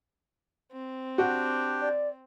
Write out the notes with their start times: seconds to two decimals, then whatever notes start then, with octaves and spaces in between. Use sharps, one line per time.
0.72 C4
1.18 D4 F#4 G4 G5
1.80 D5